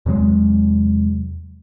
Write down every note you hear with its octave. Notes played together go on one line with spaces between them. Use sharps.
E2 C3 F#3 G#3